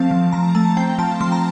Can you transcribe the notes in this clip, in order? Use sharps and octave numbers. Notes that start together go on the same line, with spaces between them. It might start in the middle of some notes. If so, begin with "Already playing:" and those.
Already playing: F3 A3 C4 F5 A5
F3
F3 A#5
A3 A5
C4 G5
F3 A5
F3 C6
A#5